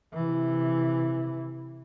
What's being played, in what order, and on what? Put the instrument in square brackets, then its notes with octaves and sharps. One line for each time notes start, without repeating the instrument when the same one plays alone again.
[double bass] C3 E3